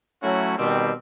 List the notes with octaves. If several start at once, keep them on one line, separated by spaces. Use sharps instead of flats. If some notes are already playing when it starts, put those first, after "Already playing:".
F#3 A3 C#4 E4 F#4
B2 D#3 G3 C4